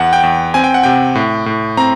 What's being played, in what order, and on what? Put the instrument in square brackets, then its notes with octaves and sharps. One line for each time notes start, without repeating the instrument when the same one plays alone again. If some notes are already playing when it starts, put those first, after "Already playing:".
Already playing: [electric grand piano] E2 F#5
G5
E2
C4 G#5
G5
F#5
C3 G5
A2
A2
C4 A#5